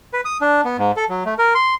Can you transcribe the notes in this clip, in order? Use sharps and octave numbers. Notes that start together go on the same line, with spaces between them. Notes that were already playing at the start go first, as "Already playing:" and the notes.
B4
D#6
D4
B3
G#2
A4
F#3
A3
A#4
C6